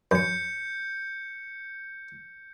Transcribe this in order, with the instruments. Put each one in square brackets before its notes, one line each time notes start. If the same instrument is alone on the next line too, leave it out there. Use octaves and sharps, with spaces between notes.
[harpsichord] F#2 [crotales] G6 C#7